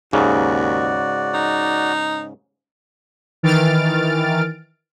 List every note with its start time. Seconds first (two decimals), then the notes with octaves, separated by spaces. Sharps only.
0.13 D#2 G#2 C#3 F#4 D5
1.34 D#4
3.43 D#3 E3 F6 A6 D7